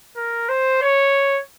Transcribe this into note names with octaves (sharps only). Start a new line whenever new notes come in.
A#4
C5
C#5